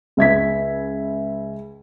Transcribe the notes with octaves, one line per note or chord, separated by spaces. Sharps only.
C#2 E5 G#6 B6